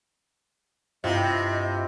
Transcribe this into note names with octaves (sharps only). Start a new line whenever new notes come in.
G2 C3 C4 E4 F4 D#5